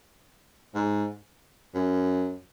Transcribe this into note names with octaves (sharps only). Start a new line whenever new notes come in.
G#2
F#2